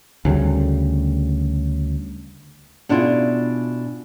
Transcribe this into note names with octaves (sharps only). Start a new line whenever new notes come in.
D2 C#3 G3
B2 D4 E4 F4 G#4